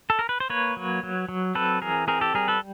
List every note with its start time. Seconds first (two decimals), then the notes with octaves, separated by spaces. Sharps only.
0.10 A4
0.19 A#4
0.29 B4
0.40 C5
0.50 A#3 B4 C#5
0.77 F#3
1.03 F#3
1.29 F#3
1.55 C4 A4 B4
1.82 E3 G#4 A#4
2.08 C4 G#4 A#4
2.21 G4 A4
2.34 G3 G#4 A#4
2.48 A4 B4